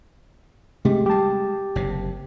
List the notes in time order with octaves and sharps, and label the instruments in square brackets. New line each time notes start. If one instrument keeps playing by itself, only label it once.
[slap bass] C3 A3 [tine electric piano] G#3 G4
[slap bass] G3 G#3 [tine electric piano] G4 A5
[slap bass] F#1 C3